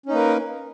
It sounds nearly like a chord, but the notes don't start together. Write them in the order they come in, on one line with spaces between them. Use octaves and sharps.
C#4 D#4 A#3 B4 A#4